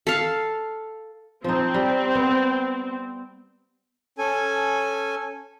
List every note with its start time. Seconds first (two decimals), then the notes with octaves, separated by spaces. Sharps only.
0.07 A4 F5
1.44 F3 C4 D#4
1.74 G3
2.15 B3
4.18 C#4 A4 G#5